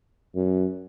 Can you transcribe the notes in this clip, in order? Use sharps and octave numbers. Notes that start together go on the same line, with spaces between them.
F#2